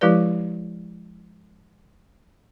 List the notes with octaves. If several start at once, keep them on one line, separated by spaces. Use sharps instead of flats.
F3 G#3 E4 G4 B4 D5